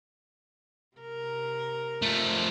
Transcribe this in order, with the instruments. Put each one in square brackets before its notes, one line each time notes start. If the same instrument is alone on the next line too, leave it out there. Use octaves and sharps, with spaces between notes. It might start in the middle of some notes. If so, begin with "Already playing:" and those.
[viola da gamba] C3 A#4
[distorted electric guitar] F3 A3